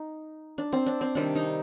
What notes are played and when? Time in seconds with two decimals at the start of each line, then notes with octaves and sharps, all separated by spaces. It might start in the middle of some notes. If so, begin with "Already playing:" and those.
Already playing: D#4
0.58 D4
0.73 C4
0.86 D4
1.01 C4
1.15 C3 D#3 G3 C4 D4
1.35 D#4